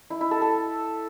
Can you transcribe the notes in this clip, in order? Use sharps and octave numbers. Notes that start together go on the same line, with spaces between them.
E4
E4
A4
A4